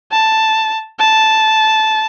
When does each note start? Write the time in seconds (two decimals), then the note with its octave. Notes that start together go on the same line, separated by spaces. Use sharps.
0.12 A5
0.99 A5